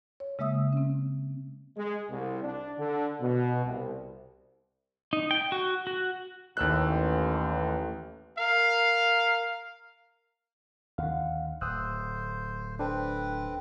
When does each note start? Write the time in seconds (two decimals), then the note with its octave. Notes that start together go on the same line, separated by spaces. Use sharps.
0.20 C#5
0.39 C#3 G#3 A#3 E5 D#6 E6
0.73 C4 C#4
1.77 G#3
2.10 C2
2.44 D4
2.78 D3
3.21 B2
3.65 C2
5.13 D#4
5.31 G5
5.52 F#4
5.87 F#4
6.57 A1 D#2 E6 F#6
8.38 A#4 F5
10.98 D#2 D3 F5 F#5
11.61 D1 C5 D#6 E6 F#6
12.79 C4 D4 A4 B4 C5